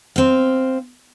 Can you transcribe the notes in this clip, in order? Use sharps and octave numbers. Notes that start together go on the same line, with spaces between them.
C4 F5